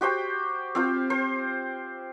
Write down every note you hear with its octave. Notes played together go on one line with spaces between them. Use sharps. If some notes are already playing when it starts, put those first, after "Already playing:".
F#4 G4 C5 G5
C4 F4 C5
C5